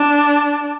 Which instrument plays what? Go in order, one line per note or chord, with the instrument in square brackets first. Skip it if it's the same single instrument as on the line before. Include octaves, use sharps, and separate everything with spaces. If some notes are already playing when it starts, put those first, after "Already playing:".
Already playing: [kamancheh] D4